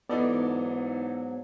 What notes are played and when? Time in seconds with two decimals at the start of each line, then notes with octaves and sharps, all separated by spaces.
0.09 G#2 E3 F#3 B3 D#4 A4 D5